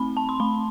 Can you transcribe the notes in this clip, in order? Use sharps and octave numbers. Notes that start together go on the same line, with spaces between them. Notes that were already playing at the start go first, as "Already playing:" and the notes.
Already playing: A3 C4 B5
A5
C6
A3 B5